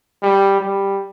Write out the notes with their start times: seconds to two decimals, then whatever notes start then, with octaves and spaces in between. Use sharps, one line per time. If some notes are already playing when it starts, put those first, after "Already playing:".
0.22 G3
0.60 G3